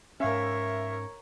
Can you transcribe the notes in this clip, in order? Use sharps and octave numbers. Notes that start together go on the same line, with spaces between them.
G#2 C#4 A#4 C#5 E5 F5